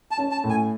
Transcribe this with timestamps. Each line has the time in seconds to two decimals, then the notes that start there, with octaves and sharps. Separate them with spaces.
0.11 A5
0.18 C#4
0.31 A5
0.44 A2
0.50 G#5